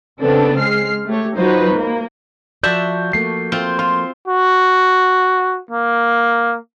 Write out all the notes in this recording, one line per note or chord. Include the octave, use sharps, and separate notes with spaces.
C#3 B3 C4 D4 A4
G#3 F6 C7
A3 G4 C#5
F#3 D#4 F4 F#4 B4 C5
A#3
F3 F#4 D5 E5 A5 G6
F3 A3 A#3 C7
C4 F4
F4 C6
F#4
A#3